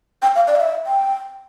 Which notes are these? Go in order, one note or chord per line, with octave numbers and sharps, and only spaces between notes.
G5
F5
D5
F5
E5
G5